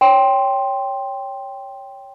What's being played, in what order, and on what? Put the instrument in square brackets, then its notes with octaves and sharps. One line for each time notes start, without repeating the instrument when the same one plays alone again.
[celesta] C#5 G5 C6